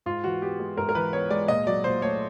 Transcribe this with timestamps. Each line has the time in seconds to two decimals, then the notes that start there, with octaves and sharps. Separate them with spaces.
0.06 G#2 F4
0.24 E3 F#4
0.42 B3 G4
0.60 G#3
0.78 G#2 A#4
0.89 A#4
0.95 E3 B4
1.13 B3 C#5
1.30 G#3 D5
1.48 A#2 D#5
1.67 F#3 D5
1.84 A#2 C5
2.02 A3 C#5